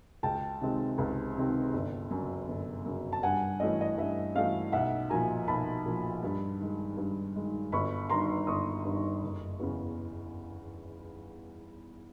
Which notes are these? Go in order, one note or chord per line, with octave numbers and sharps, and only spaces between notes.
C#2 G5 A5
C3 D#3 G#3 C4
C#2
C3 D#3 G#3 C4
G1
F#2 C#3
G1
F#2 C#3
A5
G2 F#5 G#5
E3 A3 C#4 D#5
D#5
G2 E5
E3 A3 C#4 D#5 F5
B1 E5 F#5
A#2 F3 G#5 A#5
B1 A5 B5
A#2 F3
G2
D#3 G#3
G2
D#3 G#3
G1 B5 C#6
G2 D#3 A#5 C6
G1 C#6 D#6
G2 D#3
F#1
E2 C#3